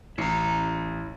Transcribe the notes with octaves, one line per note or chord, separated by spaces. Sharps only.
A1 E4 A#5 C7 C#7